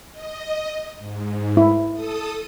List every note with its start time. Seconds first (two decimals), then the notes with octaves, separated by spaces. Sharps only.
0.12 D#5
0.98 G#2
1.57 E4
1.94 A4 D#6